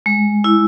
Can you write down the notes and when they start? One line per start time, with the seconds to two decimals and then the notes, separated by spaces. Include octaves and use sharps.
0.06 G#3
0.44 E4